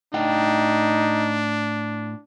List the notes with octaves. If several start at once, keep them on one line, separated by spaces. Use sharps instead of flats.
A2 D4 D#4 F5 G5